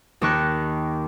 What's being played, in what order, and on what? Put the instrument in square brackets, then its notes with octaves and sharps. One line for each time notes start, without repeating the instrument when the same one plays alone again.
[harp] D#2 D#3 D#4 A5 C#6 F#6